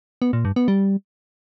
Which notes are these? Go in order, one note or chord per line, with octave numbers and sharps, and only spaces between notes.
B3
A#2
G2
B3
G3